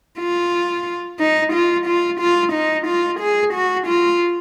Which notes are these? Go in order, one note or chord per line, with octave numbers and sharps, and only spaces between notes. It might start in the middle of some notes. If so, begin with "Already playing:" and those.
F4
D#4
F4
F4
F4
D#4
F4
G#4
F#4
F4